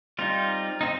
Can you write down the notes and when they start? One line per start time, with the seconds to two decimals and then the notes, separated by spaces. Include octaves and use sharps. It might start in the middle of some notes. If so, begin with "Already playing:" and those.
0.18 G3 C4 D#4 F4
0.81 C4 D#4